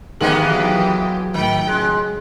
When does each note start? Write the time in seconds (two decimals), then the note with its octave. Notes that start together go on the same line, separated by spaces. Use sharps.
0.21 D#3 E3 G#3 A#3 B3 G4 F#7
0.51 F#3
1.34 A2 D#3 G5
1.67 C#2 G#3